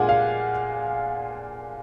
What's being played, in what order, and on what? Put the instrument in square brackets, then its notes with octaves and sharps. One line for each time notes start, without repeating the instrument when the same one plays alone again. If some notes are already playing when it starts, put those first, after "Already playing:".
Already playing: [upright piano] A#2 G#3 D4 F4 [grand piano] F#5 G#5
[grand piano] F5